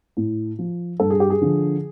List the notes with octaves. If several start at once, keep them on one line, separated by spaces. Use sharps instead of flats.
A2
F3
G2 A4
G#4
G4
G#4
D3 F3